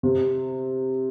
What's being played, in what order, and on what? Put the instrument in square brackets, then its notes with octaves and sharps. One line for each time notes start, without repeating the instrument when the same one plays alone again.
[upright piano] C3